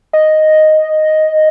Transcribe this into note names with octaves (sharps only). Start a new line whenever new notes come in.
D#5